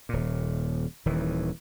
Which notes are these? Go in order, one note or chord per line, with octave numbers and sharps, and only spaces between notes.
D#1 A#2
D#1 D#3 E3